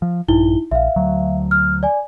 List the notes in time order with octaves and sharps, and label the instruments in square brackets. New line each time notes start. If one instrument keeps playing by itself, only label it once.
[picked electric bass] F3
[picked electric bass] A#1 G2 [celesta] D#4 E4 G7
[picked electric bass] A#1 [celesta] E5 F5
[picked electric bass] D2 F#3
[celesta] F6
D5 G#5